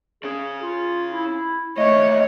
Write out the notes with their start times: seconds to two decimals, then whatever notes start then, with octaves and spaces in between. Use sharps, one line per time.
0.24 C#3 C#4 G#4
0.62 F4
1.11 E4
1.78 D#2 A3 C#5 D#5